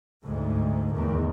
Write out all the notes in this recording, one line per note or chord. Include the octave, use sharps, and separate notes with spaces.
D2 G#2
E2 D#3